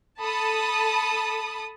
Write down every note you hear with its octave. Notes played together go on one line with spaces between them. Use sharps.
A4 A5 B5 D#6